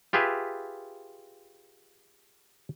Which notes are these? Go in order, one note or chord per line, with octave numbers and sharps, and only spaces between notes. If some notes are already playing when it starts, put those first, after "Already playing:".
F4 G4 G#4 B4 E5